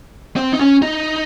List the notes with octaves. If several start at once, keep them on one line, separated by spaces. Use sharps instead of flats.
C4
D#4
C#4
D#4